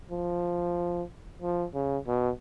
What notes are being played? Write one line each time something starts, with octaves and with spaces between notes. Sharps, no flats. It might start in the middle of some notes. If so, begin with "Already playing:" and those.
F3
F3
C#3
B2